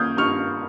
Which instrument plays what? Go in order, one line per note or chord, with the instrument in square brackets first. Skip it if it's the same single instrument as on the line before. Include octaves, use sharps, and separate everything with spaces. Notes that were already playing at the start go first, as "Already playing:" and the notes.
Already playing: [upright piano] A#3 D#6 F6 G6 G#6
G2 C#6 F6